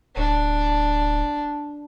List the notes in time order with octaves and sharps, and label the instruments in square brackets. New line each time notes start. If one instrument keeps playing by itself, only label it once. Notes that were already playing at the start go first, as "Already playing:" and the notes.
[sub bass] D1 [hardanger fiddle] D4